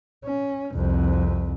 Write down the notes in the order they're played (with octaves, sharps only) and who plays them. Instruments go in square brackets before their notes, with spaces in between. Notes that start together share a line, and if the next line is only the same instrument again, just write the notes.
[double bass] C#4
C2 F2